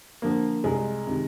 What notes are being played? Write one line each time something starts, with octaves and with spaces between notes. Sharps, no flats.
D3 F3 A#3
C2 G#3
C3 D#3